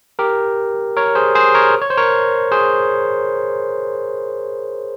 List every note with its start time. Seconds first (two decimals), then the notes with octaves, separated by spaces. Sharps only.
0.19 G4 A#4
0.97 A#4 C#5
1.15 G#4 C5
1.35 G#4 C5
1.54 A#4 C#5
1.81 C#5
1.90 C5
1.97 A#4 C#5
2.52 G#4 C5